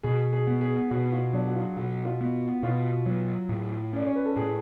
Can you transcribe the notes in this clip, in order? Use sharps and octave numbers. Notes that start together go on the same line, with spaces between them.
B2 G#4
G#4
B3
G#4
B2 F#4
F4
F#3 D4
F#4
F4
B2 F#4
F4
B3
B2 F4
F#3
A2
C#4 D5
C#5
B4
A4
A2 G#4